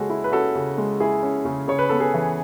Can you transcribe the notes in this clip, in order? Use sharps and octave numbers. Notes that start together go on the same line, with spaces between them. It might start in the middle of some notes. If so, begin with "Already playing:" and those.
Already playing: C#3 G#3 C#4 F#4 G#4 A4
E4
B4
C#4 F#4 A4
C#3
G#3
E4 G#4
C#4
C#3
C#3 C#5
B4
B3 A4
G#4 B4
E3